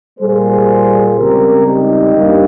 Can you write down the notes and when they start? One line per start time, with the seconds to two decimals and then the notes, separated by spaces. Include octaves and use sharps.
0.20 A#2 G3 A#3 G#4 C5
1.17 C#2 C#3 G3 C4 G4 A#4
1.66 D#4 G4
2.14 G2 G3 A#3